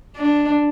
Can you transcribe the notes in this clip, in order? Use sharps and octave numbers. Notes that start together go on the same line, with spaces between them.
D4